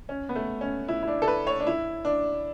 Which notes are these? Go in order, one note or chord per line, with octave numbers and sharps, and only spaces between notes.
C#4
B3
A3
C#4
E4
E4
D4
A4
B4
C#5
D4
E4
D4